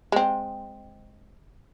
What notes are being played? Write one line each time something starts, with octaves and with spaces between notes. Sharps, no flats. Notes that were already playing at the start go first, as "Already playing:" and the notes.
G#3 C4